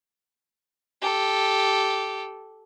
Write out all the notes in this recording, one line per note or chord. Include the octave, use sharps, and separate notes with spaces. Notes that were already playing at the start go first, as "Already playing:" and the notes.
G4 A4